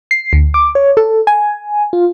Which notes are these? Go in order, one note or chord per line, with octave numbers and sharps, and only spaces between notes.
C7
D2
D6
C#5
A4
G#5
F4